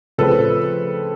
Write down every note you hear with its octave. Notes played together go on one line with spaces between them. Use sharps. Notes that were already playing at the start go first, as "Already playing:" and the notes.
C#3 F3 A3 C4 A4 B4